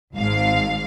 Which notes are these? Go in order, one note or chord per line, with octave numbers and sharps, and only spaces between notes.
G#1 G#2 F5